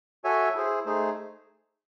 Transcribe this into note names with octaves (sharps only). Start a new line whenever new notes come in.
F#4 A4 C#5 E5 G#5
E4 G#4 C5
A3 D#4 G#4 C5